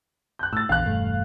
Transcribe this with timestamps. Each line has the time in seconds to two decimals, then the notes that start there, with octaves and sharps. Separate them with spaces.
0.39 F#6 G6
0.53 A2 E6 A6
0.69 A#1 E2 D3 F5 F#6
0.85 E1 G2 A3